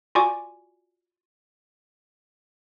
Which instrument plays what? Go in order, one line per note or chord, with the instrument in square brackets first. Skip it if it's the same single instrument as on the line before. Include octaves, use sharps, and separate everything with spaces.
[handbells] F4 F#4 D5 G#5 C#6 D6